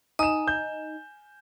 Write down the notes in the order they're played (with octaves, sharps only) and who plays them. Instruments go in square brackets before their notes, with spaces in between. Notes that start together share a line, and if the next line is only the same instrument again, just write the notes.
[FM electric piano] D#4 [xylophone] G#5 [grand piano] D#6 E7
[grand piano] G6